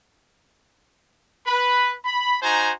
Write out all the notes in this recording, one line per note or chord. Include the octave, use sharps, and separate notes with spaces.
B4 B5
B5
D#4 F#4 C5 G#5 A#5